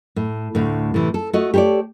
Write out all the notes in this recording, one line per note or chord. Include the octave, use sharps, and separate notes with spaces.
A2
D2 A2
A2 C3 E3
A4
A3 F#4 D#5
G4 A4 A#4 C#5 D5